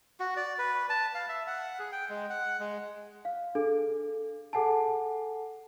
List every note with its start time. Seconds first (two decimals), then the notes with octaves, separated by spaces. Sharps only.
0.20 F#4
0.37 D5
0.58 B4
0.90 A5
1.15 F5
1.29 E5
1.47 F#5
1.79 G#4
1.92 G5
2.09 G#3
2.30 F#5
2.60 G#3
3.25 F5
3.55 D4 G#4 A4
4.53 G#4 A4 F#5 G#5 A5